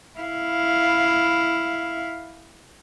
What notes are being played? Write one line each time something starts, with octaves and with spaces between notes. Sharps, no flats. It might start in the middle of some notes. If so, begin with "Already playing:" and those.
E4 F5